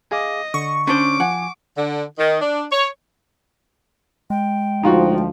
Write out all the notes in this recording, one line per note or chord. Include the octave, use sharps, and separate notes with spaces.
G#4 D#5 F5 D6
D3 C#6
C#4 D4 C5 D6
F3 F#5 G#5
D3
D#3
D4
C#5
G#3 G5
D2 F3 D#4 F4 F#4